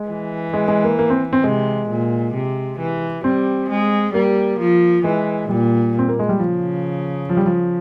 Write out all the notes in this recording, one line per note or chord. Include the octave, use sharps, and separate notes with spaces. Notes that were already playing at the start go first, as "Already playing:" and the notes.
Already playing: G#3
E3
G#3
G#3
A#3
A#3
C4
C4
C3 G#3
A#2
C3
E3
G3 C4
G#3
G3 A#3
F3
E3 G#3
A#2 G3
C4
A#3
G#3
G3
C#3 F3
F3
G3
F3